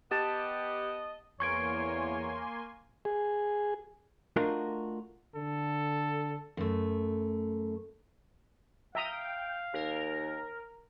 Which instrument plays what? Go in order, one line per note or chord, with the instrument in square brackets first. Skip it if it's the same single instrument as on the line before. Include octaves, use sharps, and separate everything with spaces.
[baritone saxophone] B3 [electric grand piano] G4 [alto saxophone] D#5 [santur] A5
[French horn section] E2 [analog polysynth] A#3 G#5 C6 [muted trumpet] C#5 [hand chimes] C#6 G#6 D7
[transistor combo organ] G#4
[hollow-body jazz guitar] A3 D4 F4 F#4 A#4 D#5
[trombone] D3 [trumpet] A4
[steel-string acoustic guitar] F#2 A3
[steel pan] E5 A#5 D#6 [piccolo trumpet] F5 [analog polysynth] G5
[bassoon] D#2 [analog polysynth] A#4